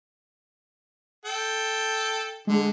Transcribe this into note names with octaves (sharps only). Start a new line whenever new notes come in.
A4 G5
D3 G#3